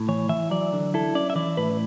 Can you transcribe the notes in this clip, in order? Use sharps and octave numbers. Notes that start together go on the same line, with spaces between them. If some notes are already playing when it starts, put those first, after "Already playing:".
Already playing: A2
E3 C#5
E3 E5
F#3 D5
D3
E4 A4
C#4 D5
E5
E3 D5
A2 B4